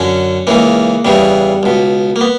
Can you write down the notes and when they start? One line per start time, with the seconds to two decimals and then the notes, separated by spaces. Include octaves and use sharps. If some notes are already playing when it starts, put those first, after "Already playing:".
Already playing: F#2 D3 C#4
0.47 C#2 C#3 E3 A#3
1.05 E2 C#3 E3 G3
1.63 C#2 B2
2.16 A#3
2.21 B3